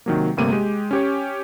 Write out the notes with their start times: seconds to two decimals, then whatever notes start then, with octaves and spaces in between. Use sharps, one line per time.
0.06 C3 D#3 F#3 A#3
0.37 G1 C3 G3 A3 A#3 D#7
0.52 G#3 G4
0.91 C#4 G4 C#5